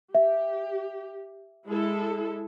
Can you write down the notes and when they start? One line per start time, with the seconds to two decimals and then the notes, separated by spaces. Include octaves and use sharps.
0.15 G4 E5
1.66 G#3 E4 A4